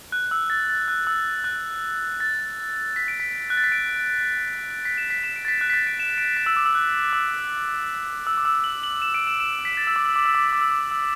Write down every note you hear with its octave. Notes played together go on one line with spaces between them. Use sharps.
F#6
E6
A6
A6
F#6
E6
F#6
A6
B6
D7
B6
F#6
A6
B6
D7
B6
E7
B6
E7
D7
A6
B6
F#6
B6
A6
D7
E7
D7
B6
E6
D6
E6
F#6
E6
E6
D6
E6
F#7
F#7
E7
D7
E7
E7
D7
B6
A6
E6
D6
E6
D6
E6
D6
E6
D6
E6
D6
E6